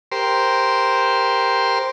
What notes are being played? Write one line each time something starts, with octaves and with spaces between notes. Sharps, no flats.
G4 A#4 C5 C6